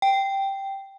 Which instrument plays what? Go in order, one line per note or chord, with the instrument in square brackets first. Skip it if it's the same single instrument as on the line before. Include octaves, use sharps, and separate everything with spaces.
[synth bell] G5